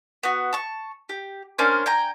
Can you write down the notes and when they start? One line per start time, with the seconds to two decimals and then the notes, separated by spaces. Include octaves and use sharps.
0.23 B3 F#4
0.53 A5 C#6
1.09 G4
1.58 A#3 C#4 D4 C5
1.86 G5 G#5 A#5